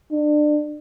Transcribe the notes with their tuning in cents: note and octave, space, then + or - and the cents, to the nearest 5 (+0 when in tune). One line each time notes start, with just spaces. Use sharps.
D4 +30